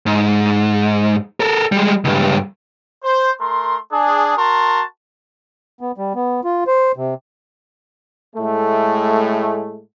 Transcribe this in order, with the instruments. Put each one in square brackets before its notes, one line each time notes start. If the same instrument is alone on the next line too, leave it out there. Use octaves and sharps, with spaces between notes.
[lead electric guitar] G#2
A4 A#4
G3 G#3
C#2 G2
[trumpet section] C5
A3 A#4 C6
D4 G#4
F#4 A#4 A5 C6
[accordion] B3
G3
B3
F4
C5
C3
[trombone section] A2 G#3 A3